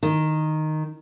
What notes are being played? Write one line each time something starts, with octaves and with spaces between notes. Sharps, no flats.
D#3